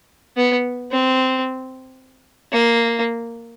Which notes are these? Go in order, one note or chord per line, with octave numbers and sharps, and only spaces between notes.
B3
C4
A#3